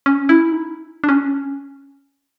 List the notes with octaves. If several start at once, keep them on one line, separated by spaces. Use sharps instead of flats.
C#4
E4
D#4
D4
C#4